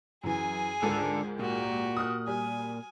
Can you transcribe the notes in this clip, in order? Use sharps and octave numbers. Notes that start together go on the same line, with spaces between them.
F#2 E3 G#4 G#5
C#2 G#2 D3 A4 A#4
A#2 F#4 G4
D#6 F6 F#6
G3 G#5